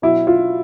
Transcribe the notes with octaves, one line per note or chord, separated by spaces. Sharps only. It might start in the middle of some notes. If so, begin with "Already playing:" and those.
B2 F#3 E4
F4